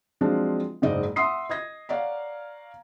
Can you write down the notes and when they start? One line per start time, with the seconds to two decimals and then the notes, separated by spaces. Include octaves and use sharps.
0.21 F3 F#3 G#3 C4 D4 F4
0.82 F#1 G#2 G#3 D#4 D5 D#5
1.16 E5 F#5 C6 D#6 C7
1.49 D#5 D#6 G#6 A#6
1.89 C#5 D5 F5 F#5 A#5